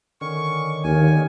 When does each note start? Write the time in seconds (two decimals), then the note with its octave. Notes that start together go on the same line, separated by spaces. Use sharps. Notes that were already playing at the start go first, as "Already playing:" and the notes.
0.21 D3 D#3 C#4 C#6
0.84 D#2 G#5